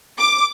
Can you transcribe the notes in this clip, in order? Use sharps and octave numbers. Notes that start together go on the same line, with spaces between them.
D6